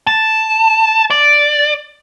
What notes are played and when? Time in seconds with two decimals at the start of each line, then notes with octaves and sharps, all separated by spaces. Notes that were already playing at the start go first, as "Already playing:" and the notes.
0.07 A5
1.10 D5